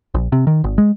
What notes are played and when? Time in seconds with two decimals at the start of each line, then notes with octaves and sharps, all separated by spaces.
0.14 A#1
0.32 C3
0.47 D#3
0.64 G#1
0.78 G#3